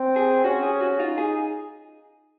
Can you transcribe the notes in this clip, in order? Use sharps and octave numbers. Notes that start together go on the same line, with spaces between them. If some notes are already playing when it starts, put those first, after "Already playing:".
Already playing: C4
G#4
C#4 F#4
G#4
F#4
D#4 F4
G#4